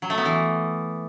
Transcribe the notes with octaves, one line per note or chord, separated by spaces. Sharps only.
F#3
A3
B3
E3